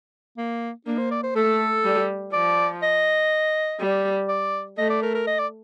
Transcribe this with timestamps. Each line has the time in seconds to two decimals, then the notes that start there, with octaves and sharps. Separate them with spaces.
0.37 A#3
0.87 A#3 D4
0.98 C5
1.11 D5
1.23 C5
1.35 A3 A4
1.84 G3
2.33 F3 D5
2.83 D#5
3.80 G3
4.29 D5
4.78 A3 D#5
4.90 D5
5.03 A#4
5.15 A#4
5.27 D#5
5.39 D5